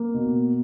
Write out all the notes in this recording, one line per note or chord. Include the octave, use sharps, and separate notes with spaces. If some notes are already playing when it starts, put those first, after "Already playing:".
Already playing: A#3
B2